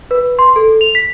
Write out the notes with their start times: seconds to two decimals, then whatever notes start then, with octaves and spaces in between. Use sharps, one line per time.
0.11 B4
0.39 C6
0.56 A4
0.81 F7
0.95 B6